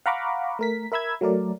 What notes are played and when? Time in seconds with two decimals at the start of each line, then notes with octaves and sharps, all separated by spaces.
0.06 F5 F#5 A#5 B5 C#6 D6
0.59 A3 A#4 B6
0.92 A#4 E5 B5 E6 G#6
1.21 F#3 A3 A#4 D5